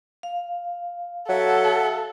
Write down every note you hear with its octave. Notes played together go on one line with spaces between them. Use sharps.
F5
F#3 A4 E5 F#5